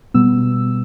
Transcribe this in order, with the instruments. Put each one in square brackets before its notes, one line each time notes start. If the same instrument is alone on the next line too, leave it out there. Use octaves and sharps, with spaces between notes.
[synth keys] B2 G3 B3 E6